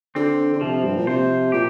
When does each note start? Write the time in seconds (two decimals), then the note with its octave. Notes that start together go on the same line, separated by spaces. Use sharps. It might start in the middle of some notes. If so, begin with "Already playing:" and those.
0.15 D3 C4
0.53 D3
0.61 C3 F3
0.84 G2
0.96 A#2
1.07 C3 C5
1.52 A#2 G4